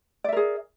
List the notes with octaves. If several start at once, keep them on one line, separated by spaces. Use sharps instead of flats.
G#4 A#4 D5 E5